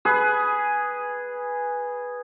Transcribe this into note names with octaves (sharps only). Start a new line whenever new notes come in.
G#4 B4